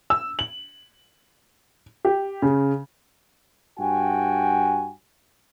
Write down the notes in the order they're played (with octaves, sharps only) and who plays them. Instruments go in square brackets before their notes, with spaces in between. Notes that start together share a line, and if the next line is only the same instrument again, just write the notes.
[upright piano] E6
F#7
G4
C#3
[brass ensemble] G2 F#4 G5 G#5